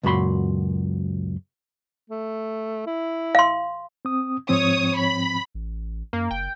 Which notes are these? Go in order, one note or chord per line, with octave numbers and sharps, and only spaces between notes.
C#2 F#2 A#2 F#4 B5 C6
A3
E4
F5 C6
C4 D#6
G#2 F3 C4 C#5 D#6
B5
A1
F#2 A#3
F#1 G5